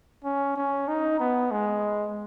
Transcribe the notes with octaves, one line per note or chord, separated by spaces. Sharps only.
C#4
C#4
D#4
B3
G#3